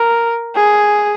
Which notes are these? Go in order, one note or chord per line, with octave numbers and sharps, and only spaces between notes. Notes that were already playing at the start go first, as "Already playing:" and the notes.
Already playing: A#4
G#4